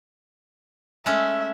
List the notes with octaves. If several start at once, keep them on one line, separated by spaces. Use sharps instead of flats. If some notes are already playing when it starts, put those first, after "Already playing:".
G#3 A3 C#4 E5